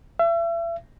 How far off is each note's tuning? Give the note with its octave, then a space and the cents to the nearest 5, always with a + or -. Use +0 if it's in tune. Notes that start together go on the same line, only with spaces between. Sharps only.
E5 +35